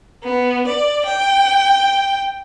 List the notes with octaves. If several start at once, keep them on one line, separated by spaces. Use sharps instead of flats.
B3
D5
G5